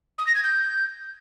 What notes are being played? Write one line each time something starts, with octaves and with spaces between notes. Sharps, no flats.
D#6
A#6
G#6
G6